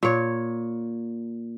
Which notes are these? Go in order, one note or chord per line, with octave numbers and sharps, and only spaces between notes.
A#2 C#5